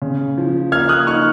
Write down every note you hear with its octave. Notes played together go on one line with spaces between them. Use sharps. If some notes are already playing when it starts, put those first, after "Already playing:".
C#3
F3
A#3 F6 G#6
D#6 F#6
D#4 C#6 F6